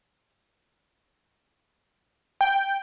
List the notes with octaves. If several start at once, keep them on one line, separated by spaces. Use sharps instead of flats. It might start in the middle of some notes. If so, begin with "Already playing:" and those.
G5